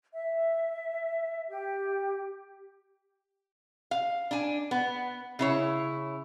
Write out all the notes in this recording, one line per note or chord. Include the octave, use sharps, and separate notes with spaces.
E5
G4
F5
D4 G#5
B3
C#3 E4 C#5